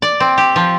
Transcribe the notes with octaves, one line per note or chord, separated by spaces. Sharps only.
D5
C4
G4
F3